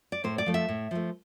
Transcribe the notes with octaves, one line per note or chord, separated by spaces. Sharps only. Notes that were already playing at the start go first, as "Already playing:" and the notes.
D5
A2 C5
D5
F3 A3
E5
A2
F3 A3